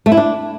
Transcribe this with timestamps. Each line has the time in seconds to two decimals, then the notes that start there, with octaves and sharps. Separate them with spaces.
0.06 A3
0.12 E4
0.17 D4